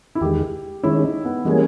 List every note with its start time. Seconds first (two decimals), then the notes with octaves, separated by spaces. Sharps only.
0.15 E4
0.21 E2 D#3 G#3 G4
0.83 D#3 G#3 C#4 E4
1.03 D#4
1.25 B3
1.45 E3 G3 G#3 A#3 C#4 G#4